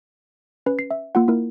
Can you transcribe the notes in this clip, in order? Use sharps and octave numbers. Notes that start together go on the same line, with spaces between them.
C#4 B4
C7
E5
A#3 F4 F#5
A#3 E4 A#4